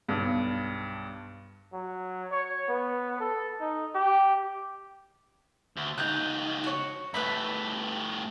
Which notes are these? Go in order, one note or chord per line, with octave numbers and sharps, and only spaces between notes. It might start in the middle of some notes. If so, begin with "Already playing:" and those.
B1 G2
F#3
C#5
B3
A4
D#4
G4
D2
C#2 D#4 F#6 G6
F#4 C#5
G2 A3 B4 E5 B5